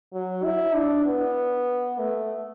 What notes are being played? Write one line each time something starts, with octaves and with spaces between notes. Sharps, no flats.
F#3
E4
D4
B3
A3